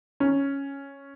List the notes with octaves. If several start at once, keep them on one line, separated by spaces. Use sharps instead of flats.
C#4